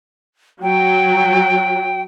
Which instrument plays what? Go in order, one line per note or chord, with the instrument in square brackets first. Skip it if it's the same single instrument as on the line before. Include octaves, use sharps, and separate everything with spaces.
[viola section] F#3 [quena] G5